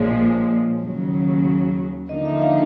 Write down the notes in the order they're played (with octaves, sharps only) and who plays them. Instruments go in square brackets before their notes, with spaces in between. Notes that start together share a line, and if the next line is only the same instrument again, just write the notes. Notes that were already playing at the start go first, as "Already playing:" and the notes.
Already playing: [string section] A#1 A#2 F3 G#3 [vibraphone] C#5
[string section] D#2 C#3 F#3
[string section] D3 F3 A#3 D#4 [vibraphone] D#5
[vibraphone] E5
F5